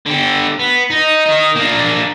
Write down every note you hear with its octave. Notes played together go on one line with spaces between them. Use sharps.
D3 G4
B3
D#4
A#4 D#5
A#3 D4